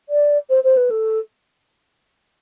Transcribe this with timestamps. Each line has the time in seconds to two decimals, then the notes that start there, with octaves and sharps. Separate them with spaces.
0.09 D5
0.49 C5
0.64 C5
0.77 B4
0.90 A4